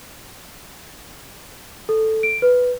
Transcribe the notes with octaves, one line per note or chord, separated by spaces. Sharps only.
A4
D7
B4